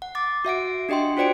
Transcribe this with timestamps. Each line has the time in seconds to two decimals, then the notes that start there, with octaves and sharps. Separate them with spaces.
0.02 F#5
0.15 D6 A6
0.45 F#4 E5 F#5 D7
0.89 D4 G4 D#5 G5 C6
1.17 F4 F#4 C5 D5 G5 D7